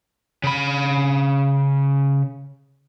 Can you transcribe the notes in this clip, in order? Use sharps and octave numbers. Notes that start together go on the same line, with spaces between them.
C#3 B5